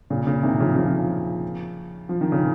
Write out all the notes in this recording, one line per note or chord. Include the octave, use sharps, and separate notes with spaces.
A#2 C#3
A#2 C#3
C3 D#3
C#3 F3
C#3 F3
F3
D#3
C#3